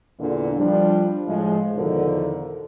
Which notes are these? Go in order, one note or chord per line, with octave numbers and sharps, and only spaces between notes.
E2 A#2 D3 E3 D4
F3 G3 D4
A2 F3 G#3
E2 B2 D3 D#3 F3 A#4